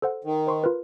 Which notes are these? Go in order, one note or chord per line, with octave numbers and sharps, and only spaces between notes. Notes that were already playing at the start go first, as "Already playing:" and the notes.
A4 C5 F#5
D#3
C5 C6 C#6
F4 A#4 B4